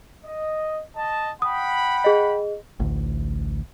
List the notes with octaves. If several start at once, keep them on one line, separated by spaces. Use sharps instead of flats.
D#5
D#5 A5
F#5 G5 B5 D#6
G#4 D#5
A1 D2